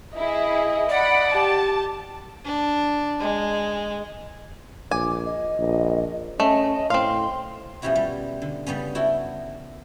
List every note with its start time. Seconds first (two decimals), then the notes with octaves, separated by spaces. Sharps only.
0.16 E4 G#4 D#5
0.89 D5 F#5 B5
1.32 G4 A5
2.45 D4
3.20 G#3
4.91 A#1 G#5 D6
5.25 D#5
5.58 A#1
6.40 A3 C#4 D#5
6.90 A2 C4 F5 C6
7.82 B2 F3 G3 C#4 E4 F#4
7.95 G3
8.42 D3
8.66 C#3 G3 B3 C#4
8.95 E4 F#4 A4 G5